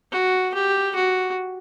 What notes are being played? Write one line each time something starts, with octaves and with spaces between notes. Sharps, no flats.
F#4
G4
F#4